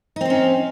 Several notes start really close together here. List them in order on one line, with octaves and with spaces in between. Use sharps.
D#4 C4 C5 C#4